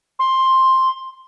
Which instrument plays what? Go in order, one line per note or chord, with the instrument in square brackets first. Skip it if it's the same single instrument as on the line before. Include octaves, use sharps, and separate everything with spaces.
[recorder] C6